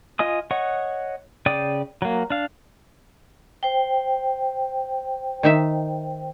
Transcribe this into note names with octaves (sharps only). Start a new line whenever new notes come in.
F4 D#5 G#5 D#6
C#5 D#5 F#5 C#6
C#3 D5 G5 D6 D#6
F#3 A#3
D4 F5
C5 G5
D#3 D#4 E5